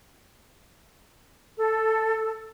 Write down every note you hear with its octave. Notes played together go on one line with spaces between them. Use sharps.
A4